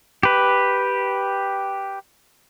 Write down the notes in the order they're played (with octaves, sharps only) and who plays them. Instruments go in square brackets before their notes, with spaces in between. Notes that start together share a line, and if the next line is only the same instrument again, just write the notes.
[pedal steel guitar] G4 B4